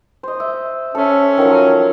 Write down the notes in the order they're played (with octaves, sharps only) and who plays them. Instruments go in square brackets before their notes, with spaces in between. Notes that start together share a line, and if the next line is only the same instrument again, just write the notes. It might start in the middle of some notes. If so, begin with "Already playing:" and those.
[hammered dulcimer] C5 D#5
E5
[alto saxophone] C#4 [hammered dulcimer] A4 E5
[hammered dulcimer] D#3 F3 F#3